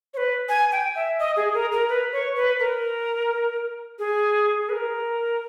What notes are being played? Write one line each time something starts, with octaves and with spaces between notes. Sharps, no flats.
C#5
B4
G#5
G5
E5
D#5
G#4
A#4
A#4
B4
C#5
B4
A#4
G#4
G#4
B4
A#4